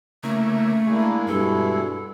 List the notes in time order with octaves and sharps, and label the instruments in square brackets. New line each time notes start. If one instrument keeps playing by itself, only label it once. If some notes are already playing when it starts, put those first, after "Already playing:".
[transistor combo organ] C#3 A#3 E4 [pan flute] A3
[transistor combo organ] G#3 [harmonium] A#3 D4 E4
[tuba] G2 [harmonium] B2 E4 [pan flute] A4